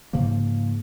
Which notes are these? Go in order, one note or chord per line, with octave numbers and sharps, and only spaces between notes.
G#2 C#3 F3 A#3